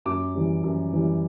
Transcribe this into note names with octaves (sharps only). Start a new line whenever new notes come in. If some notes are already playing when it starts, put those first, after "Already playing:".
F#2 D6
E3 G3
F#2
E3 G3